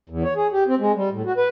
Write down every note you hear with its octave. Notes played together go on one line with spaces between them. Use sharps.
E2
C#5
G#4
G4
C4
G#3
G3
A2
F#4
B4